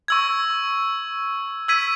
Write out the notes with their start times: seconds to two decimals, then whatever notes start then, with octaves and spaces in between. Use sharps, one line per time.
0.08 C#6 E6 G#6
1.68 E6 G#6 B6 D#7